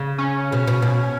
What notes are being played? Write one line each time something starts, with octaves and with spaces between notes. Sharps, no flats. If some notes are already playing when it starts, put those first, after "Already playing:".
Already playing: C#3
C#4
B2
B2
B2